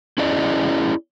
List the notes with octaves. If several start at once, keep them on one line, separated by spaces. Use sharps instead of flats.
C#4 E4 G#4 D5 D#5